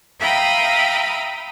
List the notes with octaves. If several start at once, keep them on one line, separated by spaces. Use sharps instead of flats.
E5 F5 G5 A#5 B5 D#6